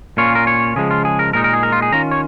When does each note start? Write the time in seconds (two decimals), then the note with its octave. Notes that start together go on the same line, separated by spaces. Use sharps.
0.17 A#2 A#3 C#4 F4 C#5
0.35 A#4
0.47 C#5
0.76 C#3 F3 G#3 G#4
0.91 F4
1.05 G#4
1.19 A#4
1.33 A#2 G#3 D#4 A#4
1.44 A#4
1.53 G#4
1.63 A#4
1.72 F4
1.82 G#4
1.92 D#3 C#4 F4 A#5
2.11 C#5